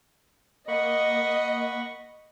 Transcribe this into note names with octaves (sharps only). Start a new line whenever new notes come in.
A#3 D#5 F#5 B5 C#6